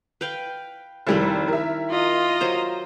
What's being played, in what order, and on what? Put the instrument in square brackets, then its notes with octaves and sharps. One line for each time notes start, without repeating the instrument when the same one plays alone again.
[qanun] B4 F5 G5
[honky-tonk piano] F1 G3 [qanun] D#3 E4 A4
[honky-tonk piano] A#4 E5
[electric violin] F4 D#5
[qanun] F#3 C5 A#5